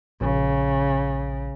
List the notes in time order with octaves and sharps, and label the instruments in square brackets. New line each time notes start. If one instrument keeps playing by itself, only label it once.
[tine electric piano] A#1 [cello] C#3